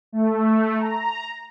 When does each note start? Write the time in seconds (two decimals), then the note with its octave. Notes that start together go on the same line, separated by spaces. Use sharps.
0.12 A3
0.77 A#5